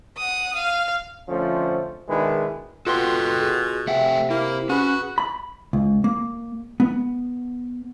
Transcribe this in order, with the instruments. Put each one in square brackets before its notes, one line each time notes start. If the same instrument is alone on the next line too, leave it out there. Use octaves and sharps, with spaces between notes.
[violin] F#5 D#6
F5
[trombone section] F2 D3 F3 A3 C#4 C5
B2 D#3 G#3 D4 E4 B4
[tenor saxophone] B2 [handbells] F4 B4 C6 [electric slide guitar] A4 F#5 G5
[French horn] G#4
[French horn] C3 [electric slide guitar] A3 F#5 G5 [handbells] E5
[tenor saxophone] A#3 [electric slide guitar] E4
[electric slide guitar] C#4 [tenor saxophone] F#4 [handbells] G#4 B4 B5
[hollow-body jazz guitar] B5
C#2
A#3
B3